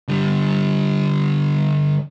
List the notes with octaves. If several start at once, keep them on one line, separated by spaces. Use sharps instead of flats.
D3 G3